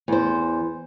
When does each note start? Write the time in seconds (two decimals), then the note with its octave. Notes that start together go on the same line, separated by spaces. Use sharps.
0.08 E2 C5